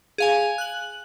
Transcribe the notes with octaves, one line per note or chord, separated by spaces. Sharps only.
G#4 F5 G#5
F#6 F#7